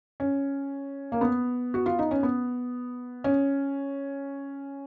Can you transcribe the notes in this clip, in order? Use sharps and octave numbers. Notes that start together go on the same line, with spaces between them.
C#4
A#3
B3
F#4
F4
D#4
C#4
B3
C#4